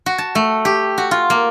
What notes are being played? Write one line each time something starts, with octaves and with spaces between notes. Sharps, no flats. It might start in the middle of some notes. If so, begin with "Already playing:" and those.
F#4
A5
A3
G4
F#4
F4
A#3